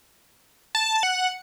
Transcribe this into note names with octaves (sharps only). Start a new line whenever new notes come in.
A5
F#5